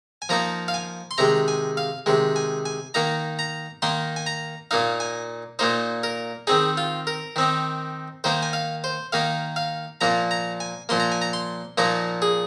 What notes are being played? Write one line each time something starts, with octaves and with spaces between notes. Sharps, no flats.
G#5
F3 A#3 D#4 A#5
F5
G#5
C6
C3 D#3 G#3 A#5
G#5
F5
C3 D#3 G#3
G#5
G#5
D#3 A#3 D#4 A#5
A#5
D#3 A#3 D#4 C6
G#5
A#5
A#2 A#3 D#4 F5
G#5
A#2 A#3 D#4 C5
A#4
D#3 C4 D#4 G#4
F4
A#4
D#3 C4 D#4
D#3 A#3 D#4 C5
G#5
F5
C5
D#3 A#3 D#4 F5
F5
A#2 F3 A#3 A#5
A#5
G#5
A#2 F3 A#3 C6
A#5
G#5
A#5
C6
A#2 F3 A#3 D#4 A#5
G#4